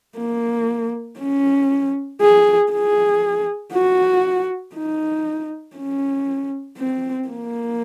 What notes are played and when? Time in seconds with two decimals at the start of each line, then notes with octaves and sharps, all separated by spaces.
0.17 A#3
1.19 C#4
2.21 G#4
2.72 G#4
3.73 F#4
4.75 D#4
5.76 C#4
6.78 C4
7.28 A#3